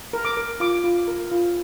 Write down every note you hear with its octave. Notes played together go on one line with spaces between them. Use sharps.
A#4
D6
A#4
F4 D6
F4
A#4
F4